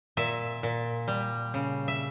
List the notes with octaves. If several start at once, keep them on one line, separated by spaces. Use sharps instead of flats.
A#2 E5
A#2
G3
C#3
E5